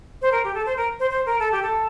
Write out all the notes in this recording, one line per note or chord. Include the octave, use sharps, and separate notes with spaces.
C5
A#4
G4
A4
C5
A#4
C5
C5
A#4
A4
G4
A4